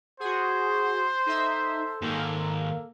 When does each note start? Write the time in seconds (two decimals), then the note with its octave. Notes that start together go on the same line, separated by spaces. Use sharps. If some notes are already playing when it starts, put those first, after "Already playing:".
0.20 F#4 G#4 C5 F#5
1.26 D#4 A4 E5
2.02 G#2 D#3 A#3